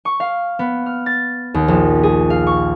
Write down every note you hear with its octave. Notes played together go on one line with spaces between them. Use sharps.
C#6
F5
B3
F6
A6
D#2
A#1
G#4
F5
C#6